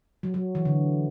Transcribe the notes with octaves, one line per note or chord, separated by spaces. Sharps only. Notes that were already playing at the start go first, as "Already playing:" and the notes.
F#3
F#3
E3
D3